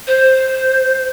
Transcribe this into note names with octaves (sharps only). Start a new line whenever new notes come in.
C5